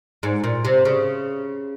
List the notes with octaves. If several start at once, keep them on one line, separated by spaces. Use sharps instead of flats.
G#2
A#2
C3
C#3